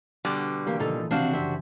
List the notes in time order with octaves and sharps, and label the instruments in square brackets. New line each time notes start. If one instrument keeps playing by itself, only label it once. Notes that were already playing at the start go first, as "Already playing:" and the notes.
[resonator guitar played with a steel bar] B2 D3 G3 [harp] B4
[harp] B1 E3 [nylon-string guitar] A#3 G4
[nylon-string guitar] A#2 D#4 A4 [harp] C#3 E3 F3
[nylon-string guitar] C3 C4 F5 [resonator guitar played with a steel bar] D4 F#4
[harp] C2 F#2 [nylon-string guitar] G4 C5 E5